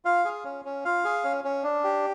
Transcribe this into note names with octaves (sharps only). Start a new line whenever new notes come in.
F4 F5
G#4
C#4
C#4
F4 F5
G#4
C#4
C#4
D4
G4